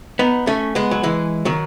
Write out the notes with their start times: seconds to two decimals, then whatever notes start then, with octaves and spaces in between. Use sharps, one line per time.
0.19 B3 D#4
0.47 A3 C#4
0.75 G#3 B3
0.91 F#3
1.03 E3 G#3
1.45 D#3 F#3